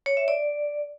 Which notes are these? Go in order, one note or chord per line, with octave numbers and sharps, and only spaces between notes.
C#5
E5
D5